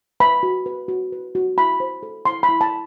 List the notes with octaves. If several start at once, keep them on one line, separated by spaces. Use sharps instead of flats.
B4 B5
F#4
B4
F#4
B4
F#4
E4 B5
C5
A4
E4 C6
B5
E4
A5